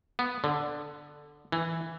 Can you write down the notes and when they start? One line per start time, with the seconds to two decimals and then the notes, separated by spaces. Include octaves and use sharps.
0.19 B3
0.44 D3
1.52 E3